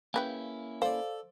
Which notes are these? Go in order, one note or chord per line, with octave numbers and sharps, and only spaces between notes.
C#3 A#3 C#4 E4 B4 G5
A4 C5 D5 F5